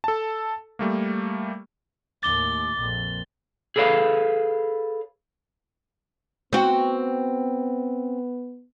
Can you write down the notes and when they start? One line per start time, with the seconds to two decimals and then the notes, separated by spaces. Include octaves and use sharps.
0.04 A4 A5
0.79 G3 A3 A#3
2.23 D#2 A2 D6 A6 G7
2.77 A#1 F2 A#2
3.76 G#4 A4 B4 C#5 F5
6.53 B3 C4 F#4